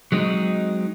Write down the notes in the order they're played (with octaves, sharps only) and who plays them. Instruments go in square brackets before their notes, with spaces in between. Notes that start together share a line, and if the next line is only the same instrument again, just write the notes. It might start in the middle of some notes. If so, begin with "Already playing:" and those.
[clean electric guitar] F#3 G#3 C4 D#4